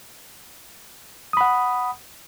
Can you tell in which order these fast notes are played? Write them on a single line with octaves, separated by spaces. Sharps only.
D#6 B5 F#5